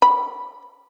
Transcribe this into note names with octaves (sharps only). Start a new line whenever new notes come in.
B5